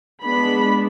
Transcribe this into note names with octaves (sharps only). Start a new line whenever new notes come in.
G#3 B3 D4 B5